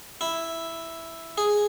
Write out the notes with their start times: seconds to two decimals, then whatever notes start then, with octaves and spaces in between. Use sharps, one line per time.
0.21 E4
1.38 G#4